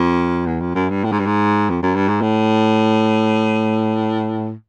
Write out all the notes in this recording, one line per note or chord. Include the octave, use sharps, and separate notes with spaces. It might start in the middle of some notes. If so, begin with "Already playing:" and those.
Already playing: F2
E2
F2
F#2
G2
A2
G#2
G2
G#2
F2
F#2
G2
G#2
A2